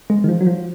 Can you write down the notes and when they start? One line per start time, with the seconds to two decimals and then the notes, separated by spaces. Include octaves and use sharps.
0.10 G#3
0.24 D#3
0.29 F3
0.41 F#3
0.47 F3